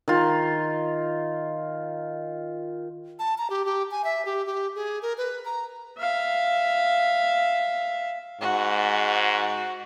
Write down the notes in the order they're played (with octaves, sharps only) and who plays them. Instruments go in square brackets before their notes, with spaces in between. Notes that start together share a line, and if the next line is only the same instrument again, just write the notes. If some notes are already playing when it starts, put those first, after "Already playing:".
[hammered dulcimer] D#3 F4
[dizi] A5
A#5
G4
G4
G#5
E5
G4
G4
G#4
A#4
B4
A#5
[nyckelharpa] E5 F5
[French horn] G#2 [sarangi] F#4